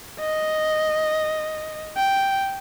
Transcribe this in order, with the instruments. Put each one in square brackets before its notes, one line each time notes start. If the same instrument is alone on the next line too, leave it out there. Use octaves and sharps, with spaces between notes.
[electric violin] D#5
G5